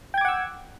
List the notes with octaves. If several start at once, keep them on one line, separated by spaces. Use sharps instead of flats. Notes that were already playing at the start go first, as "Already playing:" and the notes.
F#5 G5 D6 E6 G#6